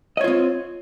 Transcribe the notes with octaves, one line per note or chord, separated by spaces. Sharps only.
C4 F4 C#5 D#5